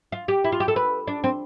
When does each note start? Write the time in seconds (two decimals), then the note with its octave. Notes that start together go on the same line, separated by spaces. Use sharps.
0.12 F4
0.28 G4
0.44 E4
0.52 F4
0.60 G4
0.68 A4
0.76 B4
1.07 D4
1.24 C4